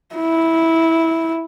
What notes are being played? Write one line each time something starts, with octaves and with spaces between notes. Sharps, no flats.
E4